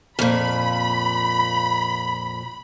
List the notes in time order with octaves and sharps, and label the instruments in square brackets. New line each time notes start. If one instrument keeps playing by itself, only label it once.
[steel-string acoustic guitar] F2 A#2 [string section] B5